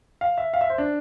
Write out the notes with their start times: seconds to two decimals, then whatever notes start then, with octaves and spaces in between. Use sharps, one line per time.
0.21 F5
0.38 E5
0.54 F5
0.61 E5
0.70 C5
0.78 D4